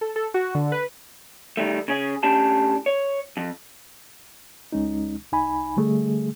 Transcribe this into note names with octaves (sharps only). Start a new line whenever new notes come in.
A4
A4
F#4
D3
B4
D#3 G3 A3
C#3 C#4 G#4
A2 C#4 D4 G4 A5
C#5
F2
C#2 G#3 C#4 D#4
C2 D#4 G#5 B5
D3 G3 A3 G#4